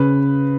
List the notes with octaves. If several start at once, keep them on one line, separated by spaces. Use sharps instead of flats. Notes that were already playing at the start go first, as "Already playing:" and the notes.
Already playing: C#3 B4